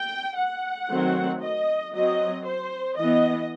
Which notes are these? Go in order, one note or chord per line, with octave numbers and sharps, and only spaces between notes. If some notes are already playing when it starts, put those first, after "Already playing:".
Already playing: G5
F#5
D#3 F#3 A3 C4
D#5
F#3 C4 D#5
C5
E3 B3 D#5